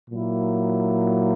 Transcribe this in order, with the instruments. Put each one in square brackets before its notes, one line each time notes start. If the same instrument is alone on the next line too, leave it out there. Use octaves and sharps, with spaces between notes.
[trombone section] A#2 F#3 A#3 E4